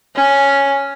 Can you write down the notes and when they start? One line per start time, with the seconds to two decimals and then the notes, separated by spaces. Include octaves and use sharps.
0.16 C#4